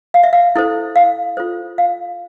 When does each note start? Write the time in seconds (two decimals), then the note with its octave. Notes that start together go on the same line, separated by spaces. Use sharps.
0.14 F5
0.23 E5
0.33 F5
0.56 E4 A4 C5
0.96 F5
1.37 F4 A4 C5
1.78 F5